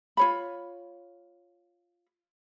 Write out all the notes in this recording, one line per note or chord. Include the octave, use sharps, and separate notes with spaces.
F4 C#5 B5